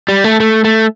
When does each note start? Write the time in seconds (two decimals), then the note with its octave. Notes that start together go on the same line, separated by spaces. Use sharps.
0.08 G3
0.24 A3
0.40 A3
0.64 A3